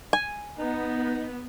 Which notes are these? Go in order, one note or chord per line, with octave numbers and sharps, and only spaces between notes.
G#5
B3 D#4